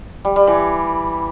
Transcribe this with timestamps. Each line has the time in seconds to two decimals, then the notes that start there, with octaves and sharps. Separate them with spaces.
0.25 G3
0.36 G3
0.47 E3